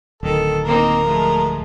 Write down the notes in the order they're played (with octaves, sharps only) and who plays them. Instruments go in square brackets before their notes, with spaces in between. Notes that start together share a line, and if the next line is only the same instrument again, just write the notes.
[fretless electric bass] D1 [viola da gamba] D#3 [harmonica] A4
[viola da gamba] A#3 C4 D#4 [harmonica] A#4
[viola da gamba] F3 G#3 A3